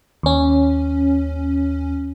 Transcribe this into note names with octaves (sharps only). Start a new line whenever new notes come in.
D#2 C#4